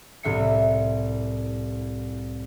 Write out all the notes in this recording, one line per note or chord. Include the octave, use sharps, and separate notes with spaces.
C2 A2 E5 C7 C#7